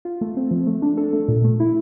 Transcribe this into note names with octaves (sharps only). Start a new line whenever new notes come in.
F4
A3
C4
F3
A3
D4
A4
A3
A#2
A3
E4